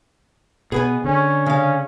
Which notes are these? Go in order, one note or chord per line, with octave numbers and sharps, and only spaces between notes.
B2 B3 G#4 B4 G#5
D3 C#4
C#3 C#4 F5